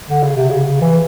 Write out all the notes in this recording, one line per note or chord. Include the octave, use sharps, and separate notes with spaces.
D3
C#3
C3
C#3
E3